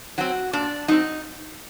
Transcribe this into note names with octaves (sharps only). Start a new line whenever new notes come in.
F#3 C4 F#4
A#2 D4
F#3 C4 D#4